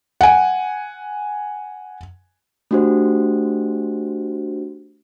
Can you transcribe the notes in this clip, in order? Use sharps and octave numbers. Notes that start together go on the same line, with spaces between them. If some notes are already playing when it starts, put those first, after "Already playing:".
F#5 G#5
A3 D4 F#4 G4 C5